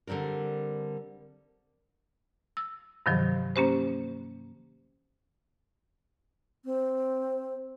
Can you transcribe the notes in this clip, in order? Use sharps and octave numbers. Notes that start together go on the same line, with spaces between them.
D3 G3 C4 D4 A#4
E6
G2 C3 D#3 F3 F#3
A#3 C#4 G4 C5
C4